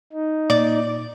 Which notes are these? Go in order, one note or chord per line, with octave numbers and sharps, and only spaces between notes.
D#4
A#2 D5